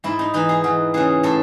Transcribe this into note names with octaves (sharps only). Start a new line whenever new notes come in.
G#2 E4
D#4
E3 D#4
G#4
E2
C#3 E3 G#4
A2 A4